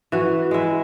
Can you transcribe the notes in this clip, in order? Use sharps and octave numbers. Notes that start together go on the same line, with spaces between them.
E3 F#4
G#3 E4